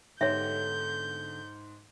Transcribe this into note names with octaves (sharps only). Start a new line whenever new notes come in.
G#2 D3 B3 G4 C#5 E5 G6